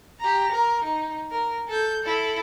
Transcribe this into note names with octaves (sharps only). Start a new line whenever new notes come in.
G4 A#5
A#4
D#4
A#4
A4 G6
E4 A4